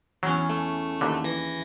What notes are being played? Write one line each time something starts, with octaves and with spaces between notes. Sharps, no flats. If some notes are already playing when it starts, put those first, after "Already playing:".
E2 F#3 C#4
A3
D#2 D3
E3 A#6